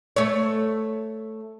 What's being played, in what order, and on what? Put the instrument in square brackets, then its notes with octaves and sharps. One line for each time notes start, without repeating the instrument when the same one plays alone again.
[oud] A3 C#5